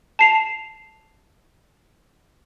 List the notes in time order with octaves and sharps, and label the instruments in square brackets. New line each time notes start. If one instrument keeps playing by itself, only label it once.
[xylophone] A5 C7 F7